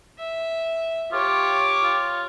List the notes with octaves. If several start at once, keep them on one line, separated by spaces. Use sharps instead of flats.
E5
F4 G4 C#5 C#6 D6
F4